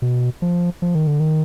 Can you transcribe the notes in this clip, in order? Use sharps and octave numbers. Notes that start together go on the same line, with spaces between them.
B2
F3
F3
D#3
D3
D#3